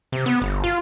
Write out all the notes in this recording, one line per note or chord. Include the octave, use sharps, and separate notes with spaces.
C3
B3
G1
F4